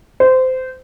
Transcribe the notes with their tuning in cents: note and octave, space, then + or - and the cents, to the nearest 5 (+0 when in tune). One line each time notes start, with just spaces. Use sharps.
C5 -20